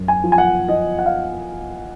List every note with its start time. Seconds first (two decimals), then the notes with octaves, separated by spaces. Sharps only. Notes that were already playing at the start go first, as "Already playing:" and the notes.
Already playing: F#2
0.08 G#5
0.24 F3
0.32 G#5
0.38 F#5
0.68 F3 D#5
0.99 F#5
1.06 F5